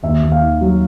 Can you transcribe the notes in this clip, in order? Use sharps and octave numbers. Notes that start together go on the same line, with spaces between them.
D#2 E5
D#2
F5
D#3
F#3